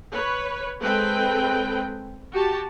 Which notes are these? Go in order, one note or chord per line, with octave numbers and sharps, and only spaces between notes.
B4 C#5
G#3 C4 A4 B4 G5
F#4 G4 A5